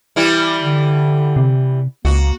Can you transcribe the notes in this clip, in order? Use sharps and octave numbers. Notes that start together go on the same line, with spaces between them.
E3 G3 E4
D3
C3
C#2 A#3 F#4